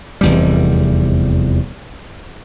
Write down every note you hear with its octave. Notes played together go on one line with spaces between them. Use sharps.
F1 E2 G3